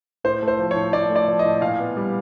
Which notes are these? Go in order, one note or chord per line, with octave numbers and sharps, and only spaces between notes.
A2 C5
A3
C5
F3
C#5
A2
A2 D5
A3
D5
F3
D#5
A2
A#2 F5
B3
G3